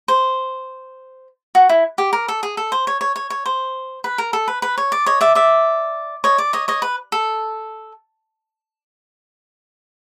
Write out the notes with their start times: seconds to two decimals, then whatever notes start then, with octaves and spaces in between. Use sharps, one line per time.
0.08 C5
1.55 F#4
1.69 E4
1.98 G4
2.13 A#4
2.28 A4
2.43 G#4
2.57 A4
2.72 C5
2.87 C#5
3.01 C#5
3.16 C#5
3.30 C#5
3.46 C5
4.04 B4
4.18 A#4
4.33 A4
4.48 B4
4.62 B4
4.78 C#5
4.92 D5
5.06 C#5 D#5
5.21 D5 E5
5.35 D5 E5
6.24 C#5 D#5
6.38 D5
6.53 C#5 D#5
6.68 C#5 D#5
6.82 B4
7.12 A4